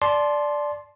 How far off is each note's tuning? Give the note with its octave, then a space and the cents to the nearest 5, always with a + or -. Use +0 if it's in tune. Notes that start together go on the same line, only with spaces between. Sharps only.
D5 +0 A5 -25 C6 +0